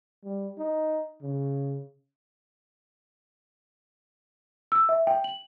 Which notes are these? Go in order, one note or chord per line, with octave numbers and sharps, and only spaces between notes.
G3
D#4
C#3
E6
E5
G5
F#7